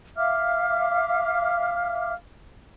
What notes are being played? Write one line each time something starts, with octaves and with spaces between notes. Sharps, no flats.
E5 F5 D6 F6